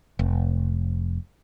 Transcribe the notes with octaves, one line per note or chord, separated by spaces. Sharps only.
F1